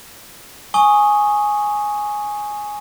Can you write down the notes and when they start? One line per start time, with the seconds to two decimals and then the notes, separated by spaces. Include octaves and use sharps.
0.74 G#5 C#6 D#6 G7